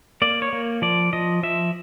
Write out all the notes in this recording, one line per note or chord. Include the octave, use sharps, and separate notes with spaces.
A#3 D5
C#5
A#3
F3 D5
F3 D#5
F3 E5